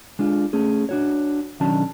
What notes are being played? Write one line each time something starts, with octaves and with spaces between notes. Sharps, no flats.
G#3 D4 F4
A3 C#4 G#4
D4 F#4 C#5
B1 D#3 F#3 C#4 D4 A5